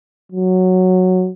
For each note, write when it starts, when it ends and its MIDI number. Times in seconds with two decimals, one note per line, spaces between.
0.32 1.30 54